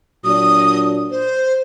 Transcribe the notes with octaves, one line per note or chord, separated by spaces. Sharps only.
A#2 F#3 D4 D#6
C5